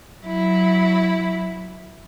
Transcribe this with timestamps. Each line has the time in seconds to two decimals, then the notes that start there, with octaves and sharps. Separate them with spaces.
0.22 F#3 E4